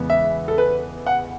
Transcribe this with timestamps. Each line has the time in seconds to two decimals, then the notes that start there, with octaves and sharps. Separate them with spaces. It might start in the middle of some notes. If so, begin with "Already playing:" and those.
Already playing: E2 C#3 G#3 B3
0.10 E5
0.48 A4
0.58 B4
1.06 F#5